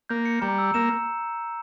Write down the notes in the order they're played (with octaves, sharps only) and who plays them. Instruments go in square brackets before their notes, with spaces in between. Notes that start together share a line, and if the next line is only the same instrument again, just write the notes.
[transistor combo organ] A#3 [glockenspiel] G6
[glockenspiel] C#7
[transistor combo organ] G3 [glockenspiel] A#5
[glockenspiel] E6
[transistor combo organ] A#3 [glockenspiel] E7